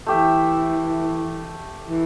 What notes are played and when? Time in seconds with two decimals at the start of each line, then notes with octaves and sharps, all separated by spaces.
0.07 E3 A3 G4 E5
1.84 E3